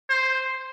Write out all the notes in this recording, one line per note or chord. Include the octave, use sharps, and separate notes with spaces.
C5